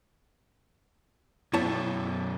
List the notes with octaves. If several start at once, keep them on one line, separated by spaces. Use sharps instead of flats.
F#2 B2 E4 C#5 A5